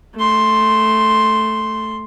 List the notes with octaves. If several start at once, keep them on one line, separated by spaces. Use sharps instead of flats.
A3 C6